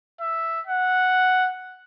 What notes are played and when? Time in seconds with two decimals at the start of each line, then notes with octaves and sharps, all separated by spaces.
0.21 E5
0.67 F#5